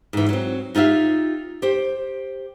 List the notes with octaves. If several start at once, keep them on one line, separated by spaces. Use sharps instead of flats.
G#2 E3
F#3 C4
D#4 F4 G4 E5 F5
G4 C5